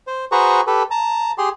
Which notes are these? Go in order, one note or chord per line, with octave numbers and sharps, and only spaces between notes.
C5
F#4 G#4 B4 C5 A#5 C#6
G4 A4 B4
A5 A#5
G4 G#4 C6